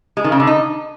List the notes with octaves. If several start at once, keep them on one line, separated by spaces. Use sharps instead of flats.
G#3
D#3
C#3
D3
D#4